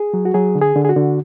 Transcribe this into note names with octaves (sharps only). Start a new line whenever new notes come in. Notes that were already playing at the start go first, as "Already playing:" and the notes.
Already playing: G#4
F#3
F#4
F#3 G#4
D3
G#4
D3
G#4
F#4
D3